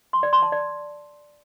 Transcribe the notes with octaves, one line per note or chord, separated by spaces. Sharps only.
C6
D5
C6
A5
D5